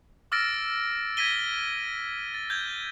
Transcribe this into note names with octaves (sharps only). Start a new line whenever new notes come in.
D6 E6 F6 A6 A#6 D7
G#6 A#6 B6 D#7 G7
A6
G6 G#6 G7